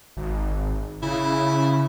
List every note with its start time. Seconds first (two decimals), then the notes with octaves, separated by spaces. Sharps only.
0.17 G#1
1.03 C#3 E4